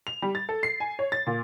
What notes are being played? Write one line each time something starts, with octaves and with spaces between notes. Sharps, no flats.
F7
G3
A6
A4
C7
G#5
C#5
A6
A#2